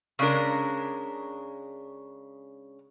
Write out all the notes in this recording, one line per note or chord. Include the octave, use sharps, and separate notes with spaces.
C#3 G#3 D4 A#4